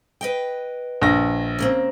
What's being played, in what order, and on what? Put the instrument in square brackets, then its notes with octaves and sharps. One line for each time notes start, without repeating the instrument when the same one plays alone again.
[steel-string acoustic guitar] B4 D#5 G5
[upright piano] A#1 A#6
[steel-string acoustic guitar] C#3 A#3 C4